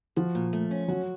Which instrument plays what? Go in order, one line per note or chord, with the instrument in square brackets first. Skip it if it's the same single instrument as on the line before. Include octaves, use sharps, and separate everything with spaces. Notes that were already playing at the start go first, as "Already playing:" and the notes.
[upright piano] F3 [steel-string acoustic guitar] F#4
[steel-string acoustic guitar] A#2
A3
C#4
[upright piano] F#3 [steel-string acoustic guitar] F#4